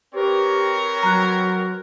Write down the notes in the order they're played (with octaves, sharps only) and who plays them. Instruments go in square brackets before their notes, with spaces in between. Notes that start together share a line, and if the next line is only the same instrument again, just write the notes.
[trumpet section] C4 A#4 C#5 [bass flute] G4 [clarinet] B4
[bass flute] F#3 [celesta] A#5 F#6